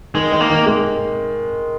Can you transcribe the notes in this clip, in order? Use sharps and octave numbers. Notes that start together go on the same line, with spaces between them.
D#3 G#3
D#3
A#3
D#3
G#3